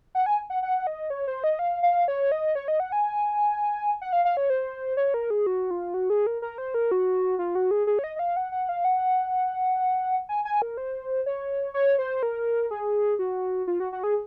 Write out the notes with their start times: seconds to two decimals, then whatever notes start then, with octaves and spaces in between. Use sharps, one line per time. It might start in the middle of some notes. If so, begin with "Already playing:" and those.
0.15 F#5
0.26 G#5
0.50 F#5
0.63 F#5
0.87 D#5
1.10 C#5
1.28 C5
1.44 D#5
1.59 F5
1.83 F5
2.08 C#5
2.32 D#5
2.55 C#5
2.68 D#5
2.80 F#5
2.92 G#5
4.01 F#5
4.13 F5
4.25 F5
4.37 C#5
4.50 C5
4.97 C#5
5.14 A#4
5.30 G#4
5.47 F#4
5.71 F4
5.94 F#4
6.10 G#4
6.27 A#4
6.42 A#4
6.58 C5
6.74 A#4
6.91 F#4
7.39 F4
7.55 F#4
7.71 G#4
7.87 G#4
7.99 C#5
8.04 D#5
8.16 D#5
8.19 F5
8.37 F#5
8.52 F#5
8.69 F5
8.85 F#5
10.29 G#5
10.45 G#5
10.62 A#4
10.77 C5
11.26 C#5
11.74 C#5
11.99 C5
12.23 A#4
12.71 G#4
13.19 F#4
13.67 F4
13.80 F#4
13.92 F#4
14.03 G#4